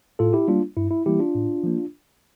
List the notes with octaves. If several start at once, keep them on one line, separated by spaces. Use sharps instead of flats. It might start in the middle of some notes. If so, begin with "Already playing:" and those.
A2 F4 A4
E4 G4
G3 A#3 D4 F4
G2 E4
E4
E3 G3 A#3 E4 G4
D4 F4
A2
F3 A#3